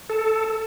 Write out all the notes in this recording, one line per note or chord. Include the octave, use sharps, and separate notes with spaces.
A4